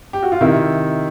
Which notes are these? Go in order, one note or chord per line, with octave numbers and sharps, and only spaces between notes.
G4
F#4
F4
C3 D#3 E4